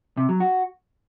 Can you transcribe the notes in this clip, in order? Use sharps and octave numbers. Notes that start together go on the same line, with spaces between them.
C3
F#3
F#4